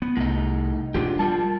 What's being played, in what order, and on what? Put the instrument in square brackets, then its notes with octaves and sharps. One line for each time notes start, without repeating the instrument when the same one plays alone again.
[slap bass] B3
[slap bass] C2 [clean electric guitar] A2 D#4
[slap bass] E1 D4 [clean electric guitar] F4 G4
[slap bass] G3 [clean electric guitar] F4 A#4 A5